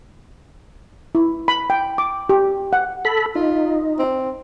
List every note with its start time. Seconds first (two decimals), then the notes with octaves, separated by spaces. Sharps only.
1.15 E4
1.48 B5
1.70 G5
1.98 D6
2.29 G4
2.73 F#5
3.05 A4 B5
3.35 D#4 F4
3.99 C4